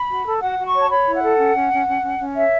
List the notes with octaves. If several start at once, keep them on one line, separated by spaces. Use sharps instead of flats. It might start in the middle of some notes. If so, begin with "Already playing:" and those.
Already playing: B5
F#4
A4
F#4 F#5
F#4
C#6
C#5
A5
C#5 B5
E4
F#5
A4
C#4
C#4
C#4
C#4
C#4
C#4
C#5 E5